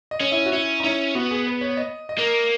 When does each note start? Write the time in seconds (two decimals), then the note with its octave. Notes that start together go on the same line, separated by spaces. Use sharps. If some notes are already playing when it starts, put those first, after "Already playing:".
0.11 D#5
0.21 C#4
0.32 E4
0.46 F#4
0.53 C#4 E4
0.80 D#4
0.84 C#4 E4
1.15 B3 F#4
1.31 G#4
1.47 B4
1.61 C#5
1.77 D#5
2.09 D#5
2.19 A#3